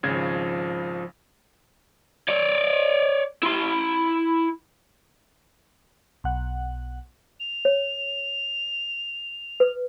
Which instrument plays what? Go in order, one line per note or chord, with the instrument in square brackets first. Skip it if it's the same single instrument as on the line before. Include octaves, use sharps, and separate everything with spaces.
[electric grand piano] G#1 C#3 G#6 [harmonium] F3
[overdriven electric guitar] C#5 D5
E4 C6
[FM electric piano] B1 F#5
[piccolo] F7
[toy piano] C#5
B4